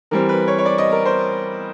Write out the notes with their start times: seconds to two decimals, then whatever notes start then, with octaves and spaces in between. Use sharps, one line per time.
0.11 E3 G3 C4 A#4
0.29 B4
0.48 C#5
0.59 C#5
0.66 D5
0.78 D#5
0.92 A#4
1.05 C5